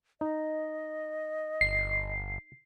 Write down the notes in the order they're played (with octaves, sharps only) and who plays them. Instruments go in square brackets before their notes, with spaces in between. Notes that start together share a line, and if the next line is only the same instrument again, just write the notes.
[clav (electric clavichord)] D#4 [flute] D#5
[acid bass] G1 [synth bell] C7